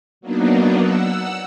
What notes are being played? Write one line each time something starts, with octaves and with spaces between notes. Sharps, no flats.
F#3 A#3 B3 D4 D#4
F#5 E6